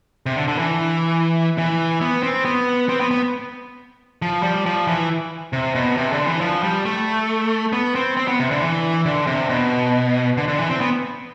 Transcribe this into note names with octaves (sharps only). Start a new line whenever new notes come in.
C3
D3
D3
E3
E3
B3
C4
B3
C4
B3
B3
F3
G3
F3
E3
C3
B2
C3
D3
E3
F3
G3
A3
B3
C4
C4
B3
C3
D3
E3
D3
C3
B2
D3
D3
E3
C4
B3